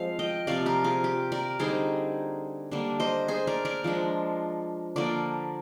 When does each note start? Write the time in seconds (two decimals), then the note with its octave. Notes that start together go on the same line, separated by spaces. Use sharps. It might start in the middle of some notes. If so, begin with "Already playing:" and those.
Already playing: F3 G#3 C4 C5 F5
0.19 D#5 G5
0.47 C3 F3 C4 D5 F5
0.66 G4 A#4
0.84 F4 G#4
1.04 G4
1.32 A#4 D5
1.59 D3 G3 C4 D#4 G#4 C5
2.71 D3 G3 A#3 D4
3.00 C5 D#5
3.28 G#4 C5
3.47 A#4 D5
3.65 A#4 D5
3.84 F3 G#3 D4
4.96 D3 F3 A#3 D4 A#4 D5